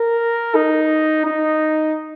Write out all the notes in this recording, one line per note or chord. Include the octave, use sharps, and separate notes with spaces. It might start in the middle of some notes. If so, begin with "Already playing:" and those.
Already playing: A#4
D#4
D#4